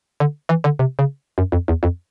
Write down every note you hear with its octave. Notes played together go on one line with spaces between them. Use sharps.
D3
E3
D3
C3
C#3
F#2
F2
E2
F2